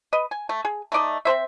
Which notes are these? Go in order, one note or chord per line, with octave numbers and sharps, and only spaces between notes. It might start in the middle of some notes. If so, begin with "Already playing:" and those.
B4 D#5
G#5
A3
G#4
A3 D#4 D5 D#5
C4 D#4 C5 E5